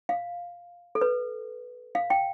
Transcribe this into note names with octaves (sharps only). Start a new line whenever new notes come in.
F5
A4
B4
F5
G5